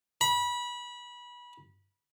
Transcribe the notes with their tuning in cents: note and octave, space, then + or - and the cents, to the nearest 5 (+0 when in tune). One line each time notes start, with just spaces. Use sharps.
B5 -25